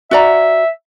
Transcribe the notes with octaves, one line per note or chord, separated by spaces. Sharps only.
F#4 D5 E5 A#5